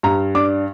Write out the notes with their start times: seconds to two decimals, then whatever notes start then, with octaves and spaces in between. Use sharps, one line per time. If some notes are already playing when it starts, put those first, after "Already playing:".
0.03 G2 A#5
0.35 D4 D6